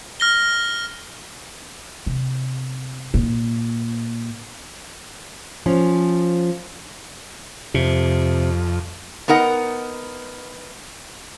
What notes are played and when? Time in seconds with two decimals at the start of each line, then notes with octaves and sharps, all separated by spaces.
0.20 F6 A#6 G7
2.06 C3
3.14 A#2
5.66 F3 C#4
7.74 F2 C3
9.28 B3 D#4 A#4 F#5